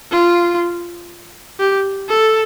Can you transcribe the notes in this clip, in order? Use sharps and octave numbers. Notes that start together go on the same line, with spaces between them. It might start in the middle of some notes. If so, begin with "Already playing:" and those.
F4
G4
A4